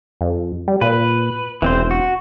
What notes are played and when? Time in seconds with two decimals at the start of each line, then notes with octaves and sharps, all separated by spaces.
0.21 F2
0.68 G3
0.81 A#2 B4
1.62 E1 E3 C4 C5
1.91 F#4